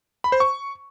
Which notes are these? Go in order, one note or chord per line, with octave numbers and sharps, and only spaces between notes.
B5
C5
C#6